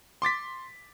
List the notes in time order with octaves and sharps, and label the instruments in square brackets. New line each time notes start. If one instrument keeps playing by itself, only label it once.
[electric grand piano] C6 D6 A6 B6